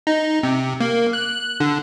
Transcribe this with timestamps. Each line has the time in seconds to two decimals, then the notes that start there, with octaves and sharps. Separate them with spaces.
0.07 D#4
0.43 C3
0.80 A#3
1.13 F#6
1.60 D3